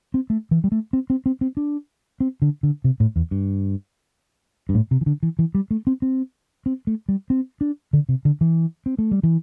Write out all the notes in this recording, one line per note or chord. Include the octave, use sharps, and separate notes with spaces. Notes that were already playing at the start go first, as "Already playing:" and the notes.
C4
A3
E3
G3
A3
C4
C4
C4
C4
D4
C4
D3
D3
C3
A2
E2
G2
G2
A2
C3
E3
D3
E3
E3
G3
A3
C4
C4
C4
A3
G3
C4
D4
D3
C3
D3
E3
C4
A3
G3
E3